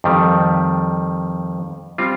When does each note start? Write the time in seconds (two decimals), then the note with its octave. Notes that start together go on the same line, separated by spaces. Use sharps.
0.04 F2 D#3 G3
1.98 G3 C4 F4